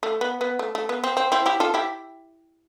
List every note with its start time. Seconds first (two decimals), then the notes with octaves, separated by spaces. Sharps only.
0.03 A3
0.21 B3
0.41 B3
0.59 A3
0.75 A3
0.89 B3
1.04 C4
1.17 C4
1.32 C4 E4
1.46 E4 G4
1.60 F4 A4
1.74 E4 G4